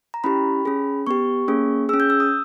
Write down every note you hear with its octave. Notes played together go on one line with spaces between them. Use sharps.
A#5
C#4 E4 G4 B5
C#4 G#4
B3 G4 C#6
A#3 C#4 G#4
C#4 G#4 E6
G6
E6
D#6